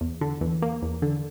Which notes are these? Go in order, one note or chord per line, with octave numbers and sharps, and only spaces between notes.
E2
D3
E2
A#3
E2
D3